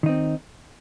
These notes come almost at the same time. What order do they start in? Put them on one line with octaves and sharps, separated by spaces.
D#3 D#4 C4